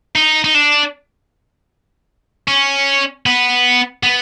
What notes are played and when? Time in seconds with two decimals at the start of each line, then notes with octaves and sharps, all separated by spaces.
0.15 D#4
0.44 D#4
0.55 D4
2.48 C#4
3.26 B3
4.03 B3